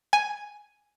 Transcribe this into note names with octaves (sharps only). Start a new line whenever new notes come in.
G#5